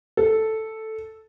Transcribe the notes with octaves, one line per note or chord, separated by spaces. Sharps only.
A4